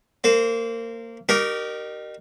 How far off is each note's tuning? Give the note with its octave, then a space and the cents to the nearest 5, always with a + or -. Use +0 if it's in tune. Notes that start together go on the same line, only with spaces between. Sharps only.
A#3 -25 C5 +0
D#4 -35 G4 -30 A#4 +0